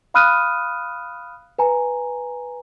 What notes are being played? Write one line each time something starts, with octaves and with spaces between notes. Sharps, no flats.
F5 B5 D#6 F6 F#6 D#7
B4 G#5 A#5